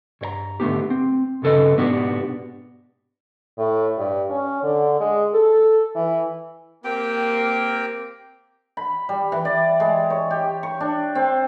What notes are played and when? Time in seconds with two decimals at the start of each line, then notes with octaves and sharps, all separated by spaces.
0.21 G2 C#5 A#5
0.60 G#2 D3 A3 B3 C#4 G4
0.90 C4
1.42 B1 G2 C#3 A4 B4 D#5
1.77 G#2 B2 B3 D4 F#4 G4
3.58 A2
3.98 G2
4.30 C#4
4.63 D3
5.00 G#3
5.34 A4
5.96 E3
6.84 A#3 C4 G4 G5
8.77 B5
9.09 G3
9.32 E3
9.45 D5
9.80 G#3
10.10 C#5
10.31 G4
10.63 C#6
10.80 D4
11.15 C4